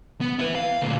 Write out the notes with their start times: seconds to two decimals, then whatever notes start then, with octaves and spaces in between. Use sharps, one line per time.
0.21 B3
0.39 E4 B4
0.55 F5
0.82 D2 A#2